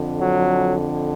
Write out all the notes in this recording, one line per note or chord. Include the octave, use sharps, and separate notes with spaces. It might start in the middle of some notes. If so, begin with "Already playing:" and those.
Already playing: F2 D3
F#3